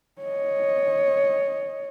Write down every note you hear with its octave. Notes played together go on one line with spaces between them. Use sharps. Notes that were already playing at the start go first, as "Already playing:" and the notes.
C#5 D#5